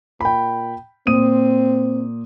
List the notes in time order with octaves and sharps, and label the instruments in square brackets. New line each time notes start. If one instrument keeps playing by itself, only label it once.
[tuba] A#2 [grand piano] G5 B5
[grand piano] A#2 D#6 D#7 [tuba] C4